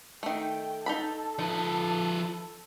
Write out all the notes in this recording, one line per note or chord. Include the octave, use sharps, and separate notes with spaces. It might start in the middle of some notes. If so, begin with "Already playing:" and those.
D#3 A3 G5
D#4 A4 A5 B5
F3 D#4 B4